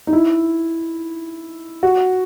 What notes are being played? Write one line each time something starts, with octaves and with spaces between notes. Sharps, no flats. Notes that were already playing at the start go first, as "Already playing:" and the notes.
D#4
E4
F#4